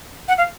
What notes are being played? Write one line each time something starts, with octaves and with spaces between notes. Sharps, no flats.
F#5
F5